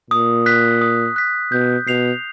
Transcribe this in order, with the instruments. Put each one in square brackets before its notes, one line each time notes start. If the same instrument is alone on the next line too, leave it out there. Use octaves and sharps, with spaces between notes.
[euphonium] A#2 [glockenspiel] D#6
[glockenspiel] F#6 B6
D#6
F#6 B6
[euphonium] B2 [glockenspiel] G6
[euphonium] B2 [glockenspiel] C7 F7